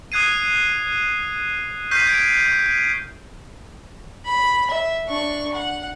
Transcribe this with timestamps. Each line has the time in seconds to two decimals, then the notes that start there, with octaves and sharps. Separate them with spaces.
0.12 D#6 F#6 G#6 C7 D#7
1.91 C#6 F6 G6 B6 C7 D#7
2.07 G#6 D7
4.26 B5
4.70 E5
5.07 D4 C#6
5.54 F#5